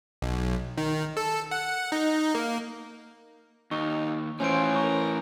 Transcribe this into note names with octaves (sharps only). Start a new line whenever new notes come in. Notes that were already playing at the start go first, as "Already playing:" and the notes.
B1
D#3
A4
F#5
D#4
A#3
D#2 D#4 C#6
A2 E3 C#4 F4 C5 G#5 G6 D7
A#4 A#5 C#6